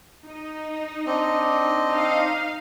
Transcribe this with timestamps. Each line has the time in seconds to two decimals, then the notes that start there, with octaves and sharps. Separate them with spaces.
0.23 D#4
1.06 C4 D4 D#5
1.90 D#4 F5